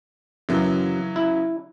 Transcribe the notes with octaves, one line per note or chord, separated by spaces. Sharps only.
F#2 C#3 E3 F#3
E4